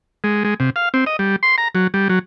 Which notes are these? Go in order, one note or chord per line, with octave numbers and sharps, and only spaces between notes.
G#3
G#3
C3
F5
C4
D#5
G3
C6
A#5
F#3
G3
F#3